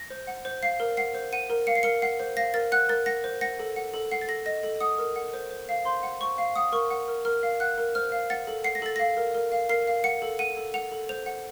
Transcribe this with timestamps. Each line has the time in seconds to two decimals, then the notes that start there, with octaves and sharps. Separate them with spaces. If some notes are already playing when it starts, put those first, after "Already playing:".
Already playing: A#6
0.10 C5
0.27 F#5
0.45 C5
0.62 F5 C7
0.80 A#4
0.97 F#5 C7
1.15 C5
1.32 F#5 D#7
1.50 A#4
1.67 F5 C#7
1.75 C7
1.83 A#4 C#7
2.02 F#5 C7
2.20 C5
2.37 F5 A#6
2.54 A#4 A6
2.72 F#5 F#6
2.89 A#4 A6
3.06 F#5 A#6
3.24 C5
3.41 F#5 A#6
3.59 A4
3.76 F#5
3.94 A4
4.11 F#5 C7
4.21 A6
4.28 A4 A#6
4.46 D#5 A#6
4.63 A4
4.81 F#5 D#6
4.98 A#4
5.16 F#5
5.34 C5
5.51 C5
5.69 F5
5.85 C5 C6
6.03 F#5
6.20 C5 C#6
6.38 F5
6.56 F#5 D#6
6.72 A#4 C#6
6.90 F#5
7.08 A#4
7.25 A#4 F6
7.43 F5
7.60 F#5 F#6
7.78 A#4
7.95 C5 F6
8.12 F5
8.30 F#5 A6
8.47 A4
8.64 F#5 C7
8.75 A#6
8.82 A4 A6
8.96 F5 A#6
9.17 A#4
9.35 A#4
9.52 F5
9.69 A#4 C7
9.87 F5
10.04 F#5 C#7
10.22 A4
10.39 F#5 D#7
10.57 A4
10.74 F#5 F7
10.92 A4
11.09 C5 F7
11.26 F#5